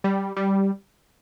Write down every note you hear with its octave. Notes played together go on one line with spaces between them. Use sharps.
G3
G3